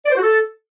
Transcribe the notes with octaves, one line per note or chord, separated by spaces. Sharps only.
D5
C5
F#4
A4